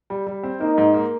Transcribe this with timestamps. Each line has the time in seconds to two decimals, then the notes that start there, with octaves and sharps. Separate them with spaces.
0.10 G3
0.27 G3
0.43 C4
0.61 A#3 D#4
0.78 G#2
0.94 A#3